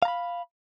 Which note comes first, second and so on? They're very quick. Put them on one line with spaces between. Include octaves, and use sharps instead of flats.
F5 A#5 B5